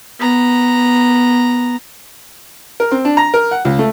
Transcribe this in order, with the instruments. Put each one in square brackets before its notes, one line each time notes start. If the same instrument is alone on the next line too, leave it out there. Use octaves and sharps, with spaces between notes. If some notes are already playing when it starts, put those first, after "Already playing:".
[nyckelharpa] B3 A#5
[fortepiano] A#4
C4
D4
A#5
A#4
F#5
C#2
A3